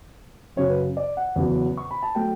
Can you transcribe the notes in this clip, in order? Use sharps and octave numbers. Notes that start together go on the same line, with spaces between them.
F#2 C#3 F#3 C#5
B4
D5
F#5
E2 C#3 F#3
C#6
B5
A5
F#3 A3 G5